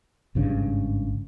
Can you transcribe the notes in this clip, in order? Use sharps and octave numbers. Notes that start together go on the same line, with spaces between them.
G#1 G2 C#3 D4